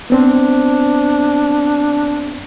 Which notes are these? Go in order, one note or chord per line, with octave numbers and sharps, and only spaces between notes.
B3 C4 D4 C5